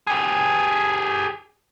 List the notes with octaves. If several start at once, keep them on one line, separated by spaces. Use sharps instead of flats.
G4 G#4